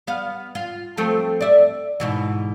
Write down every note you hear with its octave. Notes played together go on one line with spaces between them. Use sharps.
B3 F5
F4
F3 A3 C4
D5 E5
G#2 B2 E3